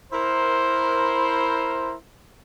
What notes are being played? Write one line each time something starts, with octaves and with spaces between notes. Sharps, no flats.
E4 A#4 C5